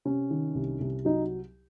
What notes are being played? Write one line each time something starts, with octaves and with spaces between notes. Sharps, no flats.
C3 C#4
D#3
C2
C2
F#3 D#4